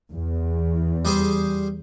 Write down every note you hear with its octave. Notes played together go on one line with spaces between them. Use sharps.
E2
G3 G#4 C5